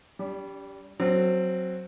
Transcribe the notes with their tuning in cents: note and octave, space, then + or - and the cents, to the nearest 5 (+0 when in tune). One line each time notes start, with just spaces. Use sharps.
G3 +0 D4 -45
F#3 +0 C4 +0 A4 +40